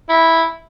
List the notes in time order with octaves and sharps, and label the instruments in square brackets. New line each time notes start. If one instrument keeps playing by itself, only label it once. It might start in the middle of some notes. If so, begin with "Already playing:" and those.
[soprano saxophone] E4